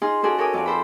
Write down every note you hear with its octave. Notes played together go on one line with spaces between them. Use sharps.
D#4 F4 G#4 C6
C#4 F#4 G#4 A4 D5
A4 A#4 C#5 G#5 D6 D#6
F2 F4 A#4 D5
A4 C5 B5